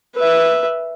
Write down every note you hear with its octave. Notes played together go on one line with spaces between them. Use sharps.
B4 E5